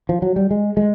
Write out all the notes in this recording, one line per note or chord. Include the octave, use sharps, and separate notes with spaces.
F3
F#3
G3
G#3
G#3